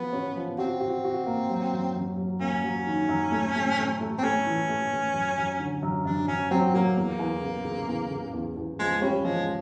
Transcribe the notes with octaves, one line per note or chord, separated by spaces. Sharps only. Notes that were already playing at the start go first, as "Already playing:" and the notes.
Already playing: F3 B3 F#4
C#4
F3
C4 F#4
F#4
F#4
A#3
F#3
F#2
F#2
F#3
A#3 C#4
F#3
D#3
F#2
A3
A3
A3
A3
C4
A3 C#4
E3
A3
A3
F#2
F#2
D3
F#2
F#2 D4
F#2 C#4
F#3 C4
F#3 A#3
E2 A#3
E2
C#3
C#3
E2
C#3
E2
E2
F3 G#3
G3 C#4
F3 G#3